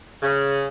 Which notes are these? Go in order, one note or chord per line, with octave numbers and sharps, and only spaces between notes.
C#3